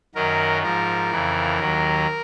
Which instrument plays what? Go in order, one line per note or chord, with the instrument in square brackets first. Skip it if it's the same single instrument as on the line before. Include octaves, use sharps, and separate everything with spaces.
[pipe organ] F#2 D#3 F#3 A#4
G#2 F3 A#4
F2 C#3 E3
D#2 D#3 F#3